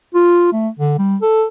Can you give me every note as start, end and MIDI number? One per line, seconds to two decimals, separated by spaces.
0.15 0.48 65
0.53 0.68 57
0.79 0.95 50
0.98 1.16 55
1.22 1.45 69